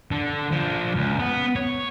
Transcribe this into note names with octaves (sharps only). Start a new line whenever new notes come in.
D3 A4
F3 D4
C#2
B3
C#5